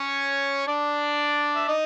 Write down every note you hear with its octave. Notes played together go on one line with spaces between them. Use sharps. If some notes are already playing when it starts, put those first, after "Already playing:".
Already playing: C#4 C#5
D4 D5
E5
D#4 D#5